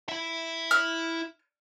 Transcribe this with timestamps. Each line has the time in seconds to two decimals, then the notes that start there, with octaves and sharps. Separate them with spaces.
0.08 E4 E5
0.71 F6